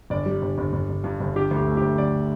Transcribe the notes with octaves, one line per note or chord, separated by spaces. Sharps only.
G1 D5
G3
G1
G1
G1
G1
G2
G1
D3 G4
D2
G4
A3
G4
D2
D3 D5